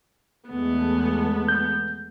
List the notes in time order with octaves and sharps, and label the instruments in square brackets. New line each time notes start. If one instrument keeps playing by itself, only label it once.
[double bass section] E2 G#3 A3 [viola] B3
[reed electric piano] G6